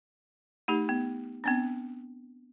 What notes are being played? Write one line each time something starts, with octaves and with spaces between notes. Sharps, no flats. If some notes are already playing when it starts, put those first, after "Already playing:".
A3 D#4 G4
B3
B3 C4 D4